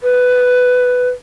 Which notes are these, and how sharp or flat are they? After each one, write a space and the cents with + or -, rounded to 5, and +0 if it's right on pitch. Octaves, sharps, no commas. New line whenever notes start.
B4 +10